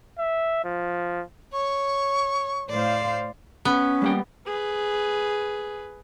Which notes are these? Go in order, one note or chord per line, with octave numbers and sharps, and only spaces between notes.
E5
F3
C#5 C#6
A2 C5 D5 F5
B3 C#4
G3 A#3 G5
G#4 B4